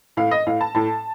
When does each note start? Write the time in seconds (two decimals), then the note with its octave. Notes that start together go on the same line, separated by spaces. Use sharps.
0.17 A2 F5
0.31 D#5
0.47 A2 F5
0.61 A5
0.75 A2 A5